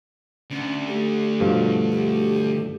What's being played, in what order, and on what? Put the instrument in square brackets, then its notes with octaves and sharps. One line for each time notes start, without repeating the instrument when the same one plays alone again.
[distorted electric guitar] D2 [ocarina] C#4
[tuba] A3 [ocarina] G4
[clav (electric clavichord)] G2 B2 F3
[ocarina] G4